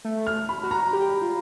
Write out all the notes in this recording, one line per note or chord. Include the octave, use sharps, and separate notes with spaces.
A3
F6
B5
F#4
A#5
G4
F4